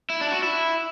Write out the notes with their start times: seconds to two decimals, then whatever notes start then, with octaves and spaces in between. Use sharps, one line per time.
0.10 E4
0.21 D4
0.32 F#4
0.43 E4